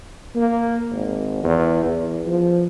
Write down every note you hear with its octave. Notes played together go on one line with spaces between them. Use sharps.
A#3
G#1
E2
E2
F3